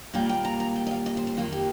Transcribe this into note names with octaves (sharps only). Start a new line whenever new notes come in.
A#2 G3 A#3 G5
G5
A#5
A#5
G5
D#5
F5
D#5
C5
C5
F2 D#3 A#3 F4
G4